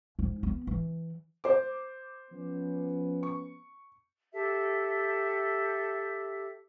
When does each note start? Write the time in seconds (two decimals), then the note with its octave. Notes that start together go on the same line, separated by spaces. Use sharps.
0.19 G#2
0.43 B3
0.67 E3
1.44 C5 D6
2.31 F3 B3 C#4
3.23 C#6
4.32 G4 A4 E5